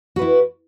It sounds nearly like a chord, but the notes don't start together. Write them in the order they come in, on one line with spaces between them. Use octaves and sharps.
F#4 B4 E4